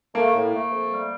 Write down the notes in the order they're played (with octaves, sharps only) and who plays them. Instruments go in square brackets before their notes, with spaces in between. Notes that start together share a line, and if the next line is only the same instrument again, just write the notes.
[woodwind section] A3 [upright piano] A#3
[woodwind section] A2
A3
F2
G3